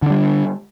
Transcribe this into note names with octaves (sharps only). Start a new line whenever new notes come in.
D3 G3 D4